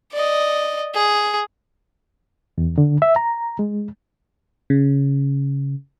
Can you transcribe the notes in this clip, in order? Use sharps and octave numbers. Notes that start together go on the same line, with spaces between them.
D5 D#5
G#4
E2
D3
E5
A#5
G#3
C#3